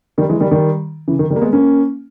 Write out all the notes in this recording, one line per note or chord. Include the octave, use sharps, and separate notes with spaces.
D#3 G3
E3 G#3
D#3 G3
D#3 G3
C#3 E3
D#3
D#3 G3
A#3
G#3 B3
A#3 C#4